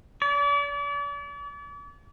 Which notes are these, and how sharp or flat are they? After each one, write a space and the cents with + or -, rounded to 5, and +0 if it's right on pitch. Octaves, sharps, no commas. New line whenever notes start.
D5 -40